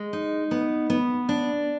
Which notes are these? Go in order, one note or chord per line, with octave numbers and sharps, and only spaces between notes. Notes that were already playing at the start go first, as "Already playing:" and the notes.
Already playing: G#3
D#4
B3
B3
D4